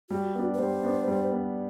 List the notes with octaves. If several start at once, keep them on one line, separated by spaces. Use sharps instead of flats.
G3 F#4
B3 D4
B4
G3 C5
B3 D4
G3
B3 D4